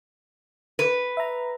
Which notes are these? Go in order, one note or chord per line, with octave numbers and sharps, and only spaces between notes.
B4
E5 A#5